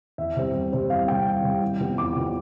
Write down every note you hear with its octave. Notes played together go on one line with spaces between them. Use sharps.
E2 E5
C3 G3 C4
E2
C3 G3 C4
E2 F5
C3 G3 C4 G5
E2
C3 G3 C4
E2
C3 F3 B3
E2 D6
C3 F3 B3